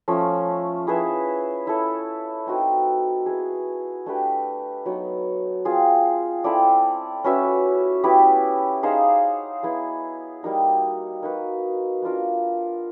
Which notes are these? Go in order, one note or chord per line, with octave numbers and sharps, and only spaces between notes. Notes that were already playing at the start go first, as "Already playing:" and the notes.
F3 A3 C#4
E4 G#4 B4 E5
E4 A4 C#5
C4 D#4 F#4 B4
B3 E4 G#4
A3 D4 G4 B4
F#3 B3 D#4
C4 F4 G#4
C4 E4 A4 D5
C#4 F#4 B4 E5
B3 E4 G4 B4
D#4 G#4 C5 F5
B3 E4 G#4
G3 A#3 D#4 F#4
A#3 D#4 F#4 B4
B3 D4 F4 A#4